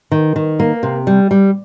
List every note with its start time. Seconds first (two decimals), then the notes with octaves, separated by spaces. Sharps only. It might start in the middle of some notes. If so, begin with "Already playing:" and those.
0.11 D#3
0.36 D#3
0.60 A#3
0.83 C3
1.07 G3
1.31 G3